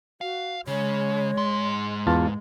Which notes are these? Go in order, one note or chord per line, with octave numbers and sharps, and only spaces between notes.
F#4 F5
C#3 G#3 C#5
G#2 C6
E2 F4 B4 A5